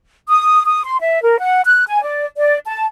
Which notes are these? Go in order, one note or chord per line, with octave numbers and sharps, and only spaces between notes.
D#6
D#6
C6
E5
A#4
F#5
F#6
G#5
D5
D5
A5